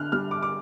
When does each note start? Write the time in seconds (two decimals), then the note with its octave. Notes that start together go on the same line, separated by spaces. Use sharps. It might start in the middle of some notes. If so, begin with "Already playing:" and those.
Already playing: D3 F6 F#6
0.12 G3 F6
0.31 D6
0.42 D6